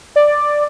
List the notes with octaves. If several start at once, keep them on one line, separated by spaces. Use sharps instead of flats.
D5